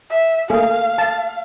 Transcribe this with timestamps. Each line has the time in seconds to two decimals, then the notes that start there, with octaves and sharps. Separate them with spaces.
0.11 E5
0.50 A3 A#3 G#4 F5
0.98 A5